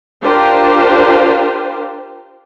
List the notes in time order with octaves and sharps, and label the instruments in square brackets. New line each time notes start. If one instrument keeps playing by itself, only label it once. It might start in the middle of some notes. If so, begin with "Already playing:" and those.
[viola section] D4 F4 G4 A#4 C5